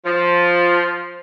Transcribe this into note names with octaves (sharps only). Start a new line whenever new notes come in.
F3